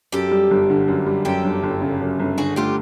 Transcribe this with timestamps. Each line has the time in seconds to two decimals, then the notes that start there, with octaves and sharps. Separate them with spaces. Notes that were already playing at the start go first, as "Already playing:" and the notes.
0.12 F#2 G4 A4
0.31 G3
0.51 G1
0.70 D3
0.88 F#2
1.07 G3
1.25 F#2 G4 A4
1.44 G1
1.63 G1
1.82 C#3
2.01 F#2
2.19 G1
2.38 D3 F#4 G#4
2.56 A3 F4 G4